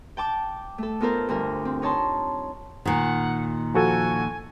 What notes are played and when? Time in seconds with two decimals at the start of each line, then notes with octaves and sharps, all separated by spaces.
0.17 G5 A5 D6
0.78 A3 A4
1.00 B3 D#4 F4 A4 A#4 C5
1.29 D2 G2 A#4
1.65 C4
1.82 D#4 C#5 A5 C6
2.85 A#2 D#3 F#5
3.74 F3 F#4 A4 G#5